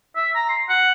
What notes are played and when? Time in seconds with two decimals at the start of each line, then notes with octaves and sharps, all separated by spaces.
0.16 E5
0.35 A#5
0.49 C6
0.69 F#5